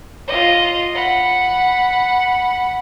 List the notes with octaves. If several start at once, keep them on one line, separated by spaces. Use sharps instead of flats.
F4 D#5
F#5 B5